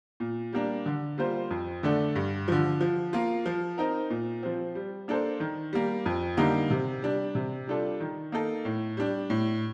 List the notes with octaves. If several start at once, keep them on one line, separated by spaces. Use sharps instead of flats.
A#2
G3 A#3 D4
D3
G3 A#3 F4 C5
F2
D3 A3 D4 A4
G2
D3 F3
F3
A#3 F4
F3
C4 D#4 A#4
A#2
F3 C4
G3
A#3 D4 A4 C5
D#3
G3 A#3
F2
D3 G3 A#3 D#4
C3
G3 D4
C3
G3 D4 F4 A4
D#3
A#3 D#4 A4
A2
G3 D4
A2